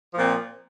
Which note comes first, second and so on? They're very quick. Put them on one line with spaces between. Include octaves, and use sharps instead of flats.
F3 A#2 C4